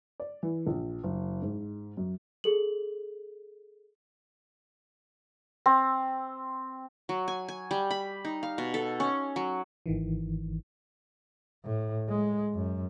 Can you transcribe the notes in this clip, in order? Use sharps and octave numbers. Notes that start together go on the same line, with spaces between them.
D5
E3
A#1
F#1
G#2
F#2
G#4 A4 F#7
C4
F#3
G#5
G#5
G3
B5
D#4
F5
B2
A4
C#4
F#3
G#1 D#3 E3
A2
G#3
F#2